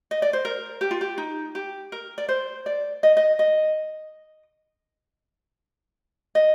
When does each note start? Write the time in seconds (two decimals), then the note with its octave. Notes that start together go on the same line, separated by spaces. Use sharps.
0.11 D#5
0.22 D5
0.33 C5
0.45 A#4
0.81 G4
0.91 F4
1.01 G4
1.18 D#4
1.55 G4
1.92 A#4
2.18 D5
2.29 C5
2.66 D5
3.03 D#5
3.17 D#5
3.39 D#5
6.35 D#5